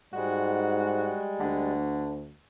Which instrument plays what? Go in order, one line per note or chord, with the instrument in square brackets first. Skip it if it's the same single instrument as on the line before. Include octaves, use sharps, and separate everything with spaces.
[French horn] G#2 [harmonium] G3 G#3 [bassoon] F#4
[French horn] D2 [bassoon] D3